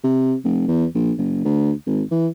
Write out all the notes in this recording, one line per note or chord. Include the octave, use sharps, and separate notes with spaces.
C3
F1
E2
A#1
F#1
D2
G#1
E3